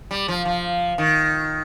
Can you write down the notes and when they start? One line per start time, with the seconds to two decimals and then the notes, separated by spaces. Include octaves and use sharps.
0.11 G3
0.28 F3
0.45 F3
0.98 D#3